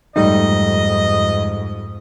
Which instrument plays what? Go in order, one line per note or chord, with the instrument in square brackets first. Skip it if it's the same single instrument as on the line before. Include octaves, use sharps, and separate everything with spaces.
[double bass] F2 G#2 [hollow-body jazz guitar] G3 A3 D#4 [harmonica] D#5